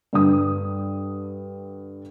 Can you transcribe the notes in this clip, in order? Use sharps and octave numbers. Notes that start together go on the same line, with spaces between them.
G2 D3 G3 D#6